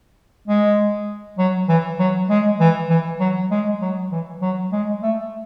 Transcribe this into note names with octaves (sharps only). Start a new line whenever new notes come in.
G#3
F#3
E3
F#3
G#3
E3
E3
F#3
G#3
F#3
E3
F#3
G#3
A3